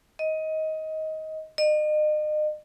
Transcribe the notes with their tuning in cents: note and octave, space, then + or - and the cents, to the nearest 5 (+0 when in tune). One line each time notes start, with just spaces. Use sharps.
D#5 +20
D#5 -40